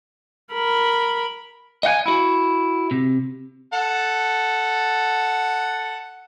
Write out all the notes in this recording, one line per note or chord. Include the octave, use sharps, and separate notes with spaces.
A#4 B5
D#5 F5 F#5 G#5
E4 F#4
C3
A4 F#5